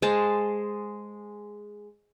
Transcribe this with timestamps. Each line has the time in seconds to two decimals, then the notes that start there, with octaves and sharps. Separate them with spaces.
0.02 G#3 C5 A5